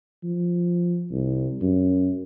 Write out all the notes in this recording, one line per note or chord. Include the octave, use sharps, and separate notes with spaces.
F3
C2
F#2